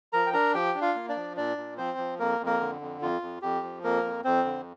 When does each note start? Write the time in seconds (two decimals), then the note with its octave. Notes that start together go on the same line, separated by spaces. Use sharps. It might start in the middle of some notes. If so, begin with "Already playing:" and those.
0.13 F3 A#4 A#5
0.26 G5
0.33 D4 A#4 A#5
0.54 F3 G4 G5
0.75 D4
0.81 F4 F5
0.95 A#3
1.09 D4 D5
1.16 F3
1.36 A#2 D4 D5
1.57 A#2
1.78 F3 C4 C5
1.98 F3
2.19 F2 A#3 A#4
2.40 F2
2.46 A#3 A#4
2.60 D3
2.81 F2
3.02 F2 F4
3.22 F2
3.42 F2 G4
3.63 F3
3.84 F2 A#3 A#4
4.04 F2
4.24 F2 C4 C5
4.45 D3